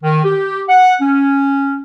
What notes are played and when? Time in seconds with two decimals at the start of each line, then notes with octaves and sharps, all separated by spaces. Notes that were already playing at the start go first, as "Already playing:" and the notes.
0.03 D#3
0.24 G4
0.68 F#5
1.00 C#4